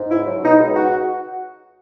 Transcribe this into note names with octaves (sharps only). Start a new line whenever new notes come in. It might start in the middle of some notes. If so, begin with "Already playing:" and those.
Already playing: G#2
C#2 E4
F#3
B2 D#4
C#2
F#4